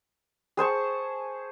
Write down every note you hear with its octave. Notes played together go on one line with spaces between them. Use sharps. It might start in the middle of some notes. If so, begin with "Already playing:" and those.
G#4 C5 A5 C#6